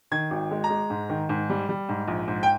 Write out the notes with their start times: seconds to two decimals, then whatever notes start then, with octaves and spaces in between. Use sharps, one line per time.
0.11 D#3 G#6
0.31 G#1
0.51 G#3
0.64 A#5
0.70 G#3
0.90 G#2
1.09 D#3
1.29 G#2
1.49 G3
1.69 G3
1.89 G#2
2.08 A#1
2.28 G#2
2.43 G5